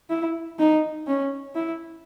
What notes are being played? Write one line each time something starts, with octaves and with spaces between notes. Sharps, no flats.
E4
D#4
C#4
E4